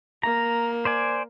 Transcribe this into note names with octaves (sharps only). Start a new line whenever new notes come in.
A#3 A#5
C5 D5 G#5